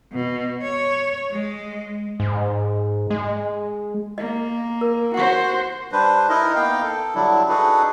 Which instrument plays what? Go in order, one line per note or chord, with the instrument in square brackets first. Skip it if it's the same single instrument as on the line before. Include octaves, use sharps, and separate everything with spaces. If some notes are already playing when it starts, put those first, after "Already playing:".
[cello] B2
C#5
G#3
[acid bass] G#2
G#3
[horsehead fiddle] A#3 [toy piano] D#5
[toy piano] A#4
[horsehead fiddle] F#4 C5 [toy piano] F#5 C#6
[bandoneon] G3 D4 B4 C5
D#4 E4 A#4 D#5
A#3 B3 D#4 F5 G5
A4
D3 F#3 G3 D4 E4
D4 D#4 F#4 G#4 A4 B4